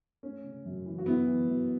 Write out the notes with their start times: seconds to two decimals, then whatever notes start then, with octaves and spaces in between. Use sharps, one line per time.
0.23 A3 C#4
0.44 C#3
0.66 F#2
0.86 E3
0.98 F#4
1.06 F#2 B3 E4
1.27 E3
1.48 F#2